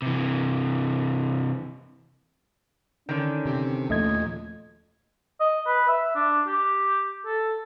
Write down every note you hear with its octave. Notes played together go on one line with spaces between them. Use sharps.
C3 E3
D3 D#3 C#4
C3
D#2 A#2 F3 A3 D#5 G#6
D#5
B4
E5
D4
G4
A4